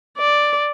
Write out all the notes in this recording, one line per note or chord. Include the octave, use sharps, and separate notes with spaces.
D5